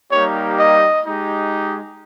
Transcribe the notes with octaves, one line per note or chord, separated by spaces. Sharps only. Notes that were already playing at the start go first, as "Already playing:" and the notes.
G3 A#3 D#4 G4 C#5
D#5
G#3 D#4 G4